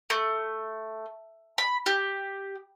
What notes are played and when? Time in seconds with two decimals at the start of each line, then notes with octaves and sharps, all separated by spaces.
0.10 A3
1.58 B5
1.86 G4